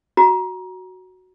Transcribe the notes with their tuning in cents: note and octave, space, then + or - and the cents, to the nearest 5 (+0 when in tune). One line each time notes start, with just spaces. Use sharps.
F#4 +0 A#5 +25